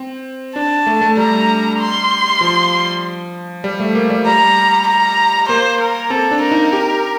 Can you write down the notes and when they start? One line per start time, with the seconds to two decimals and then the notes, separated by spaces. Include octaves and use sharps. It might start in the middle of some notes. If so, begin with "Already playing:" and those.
Already playing: C4
0.55 D4 A5
0.87 A3
1.01 A3
1.17 G3 A#5
1.80 C6
2.41 F3
3.64 G3
3.80 A3
3.95 A#3
4.10 G3
4.26 G3 A#5
4.87 A#5
5.48 A#3 C5
5.80 A#4
6.10 C4 A4
6.31 D4
6.42 A#4
6.52 D#4
6.73 G4